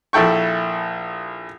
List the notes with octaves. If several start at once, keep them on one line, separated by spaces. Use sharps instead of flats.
A#1 E4 A4 G5 C#6